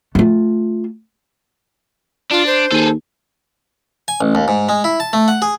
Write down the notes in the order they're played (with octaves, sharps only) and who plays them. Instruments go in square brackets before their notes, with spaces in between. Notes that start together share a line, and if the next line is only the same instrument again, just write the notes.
[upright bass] A3 F4
[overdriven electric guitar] D4 [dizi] F4
[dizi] C5
[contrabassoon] D#2 [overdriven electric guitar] G#4 A4
[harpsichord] G#5
A1
D#2
G#2
G#3
E4
A5
A3
F#5
G#4